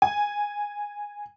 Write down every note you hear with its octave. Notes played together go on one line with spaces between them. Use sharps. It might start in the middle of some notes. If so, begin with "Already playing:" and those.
G#5